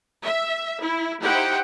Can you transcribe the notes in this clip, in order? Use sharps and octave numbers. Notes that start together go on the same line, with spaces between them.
E5
E4
D#4 E4 G4 C5 F#5 G5